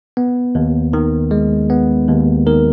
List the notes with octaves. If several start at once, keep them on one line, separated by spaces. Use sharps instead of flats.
B3
D#2
D#3
G#3
B3
D#2
D#3 A#4